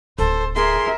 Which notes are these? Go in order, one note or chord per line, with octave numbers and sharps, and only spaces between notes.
D1 C4 A4 C5
G#4 A#4 E5 C6